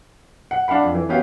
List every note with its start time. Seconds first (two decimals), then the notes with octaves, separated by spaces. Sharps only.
0.51 F#5
0.68 D4 F5 F#5 B5
0.83 F2
0.95 E3
1.09 F#3 B3 C#4 G4 F5